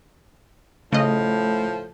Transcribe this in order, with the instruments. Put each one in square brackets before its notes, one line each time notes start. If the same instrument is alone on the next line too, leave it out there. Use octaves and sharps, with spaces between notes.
[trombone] A2 [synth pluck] C#3 D#5 [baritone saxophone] F3 [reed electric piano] A3